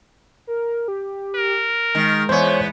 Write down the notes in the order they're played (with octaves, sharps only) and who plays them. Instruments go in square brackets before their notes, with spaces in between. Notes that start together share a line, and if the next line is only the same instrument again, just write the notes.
[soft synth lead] A#4
G4
[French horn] A#4
[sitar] D#3 [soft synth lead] G#3
[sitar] E2 B3 [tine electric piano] C5 C#5